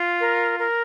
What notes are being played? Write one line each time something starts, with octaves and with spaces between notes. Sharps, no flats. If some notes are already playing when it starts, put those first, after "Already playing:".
Already playing: F4
A#4
A#4